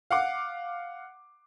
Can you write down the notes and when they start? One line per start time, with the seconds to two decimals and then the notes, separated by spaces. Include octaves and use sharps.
0.11 F5 F#5 D6